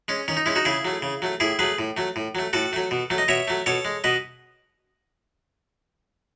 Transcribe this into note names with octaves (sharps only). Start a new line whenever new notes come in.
G#3 C#4
D#3 C#4
D#4
G#3 C#4 E4
D#4 F#4
C#3 E4 G#4
F#3 A3
C#3
F#3 A3
A2 E4 G#4
F#3 A3 G#4 B4
A2
F#3 A3
A2
F#3 A3
A2 F#4 A4
F#3 A3
B2
F#3 A3
D#5
B2 C#5 E5
F#3 A3
B2 A4 C#5
G#3
B2 B4 D#5